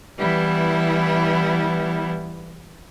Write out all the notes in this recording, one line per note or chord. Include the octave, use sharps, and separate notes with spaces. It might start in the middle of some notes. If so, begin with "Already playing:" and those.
E3 G3 B3 E4